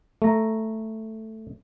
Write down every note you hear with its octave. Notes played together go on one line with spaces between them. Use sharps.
A3 A#5